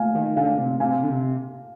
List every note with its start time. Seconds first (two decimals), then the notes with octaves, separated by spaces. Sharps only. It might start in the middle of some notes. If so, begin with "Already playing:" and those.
Already playing: F5 G#5
0.15 D#3
0.36 D3 F5 G#5
0.58 C3
0.80 C3 F5 G#5
1.03 D3
1.09 C3